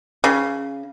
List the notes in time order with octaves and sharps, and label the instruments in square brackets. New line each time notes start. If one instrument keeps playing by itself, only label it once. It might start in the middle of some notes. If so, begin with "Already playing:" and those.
[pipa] C#3